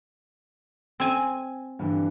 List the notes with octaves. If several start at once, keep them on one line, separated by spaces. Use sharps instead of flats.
C4 G#5
G2 D3 E3